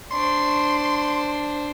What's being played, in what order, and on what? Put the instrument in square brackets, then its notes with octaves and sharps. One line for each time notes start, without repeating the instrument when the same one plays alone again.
[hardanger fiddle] D4 C5 [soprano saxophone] C6